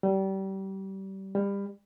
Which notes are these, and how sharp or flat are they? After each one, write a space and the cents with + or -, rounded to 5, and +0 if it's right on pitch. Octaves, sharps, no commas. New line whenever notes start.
G3 -25
G3 +30